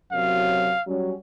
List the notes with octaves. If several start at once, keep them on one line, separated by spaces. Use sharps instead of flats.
F#2 C3 F#3 F5
F#3 G3 C#4